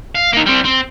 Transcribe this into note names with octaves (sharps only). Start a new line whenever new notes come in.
F5
A#3 D#4
G3 C4
C4